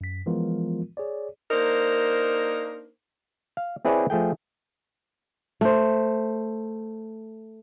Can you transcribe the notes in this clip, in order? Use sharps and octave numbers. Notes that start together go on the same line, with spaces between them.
F#2 B6
E3 F3 G#3 B3 F4 A#4
G#4 C#5 D5
A#3 D4 D#4 A#4 C5
F5
C4 E4 G#4 B4 C#5 D5
F3 A3 G#4 G5
A3 C5